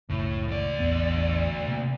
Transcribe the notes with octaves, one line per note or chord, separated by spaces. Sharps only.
F#1 C#2 A2
D2 D5
A1 E2 B3
C3 A#3